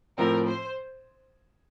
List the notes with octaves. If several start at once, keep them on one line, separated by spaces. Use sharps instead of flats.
A2 F3 C4 A#4
C5